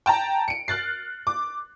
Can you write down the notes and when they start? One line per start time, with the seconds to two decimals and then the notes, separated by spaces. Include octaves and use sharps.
0.06 G5 A5 A#5
0.48 C#7 D7
0.68 F6 F#6 A6 C7
1.27 D6